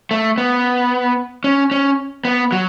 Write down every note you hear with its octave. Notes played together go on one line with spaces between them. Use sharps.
A3
B3
C#4
C#4
B3
F#3